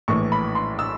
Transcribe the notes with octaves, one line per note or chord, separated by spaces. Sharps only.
A#1 A2 E3 C#6
B5
C6
E6